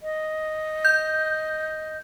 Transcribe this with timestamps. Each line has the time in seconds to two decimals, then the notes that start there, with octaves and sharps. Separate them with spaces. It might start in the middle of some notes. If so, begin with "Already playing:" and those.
0.02 D#5
0.85 G6